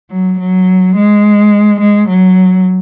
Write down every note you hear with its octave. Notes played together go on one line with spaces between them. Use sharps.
F#3
F#3
G#3
G#3
F#3